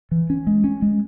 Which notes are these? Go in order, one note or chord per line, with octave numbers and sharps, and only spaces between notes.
E3
C#4
G#3
C#4
G#3